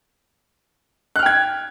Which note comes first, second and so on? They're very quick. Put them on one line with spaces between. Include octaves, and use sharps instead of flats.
F#6 F6 G5 G#6